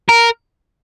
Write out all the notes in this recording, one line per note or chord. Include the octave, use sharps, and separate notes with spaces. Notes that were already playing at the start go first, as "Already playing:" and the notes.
A#4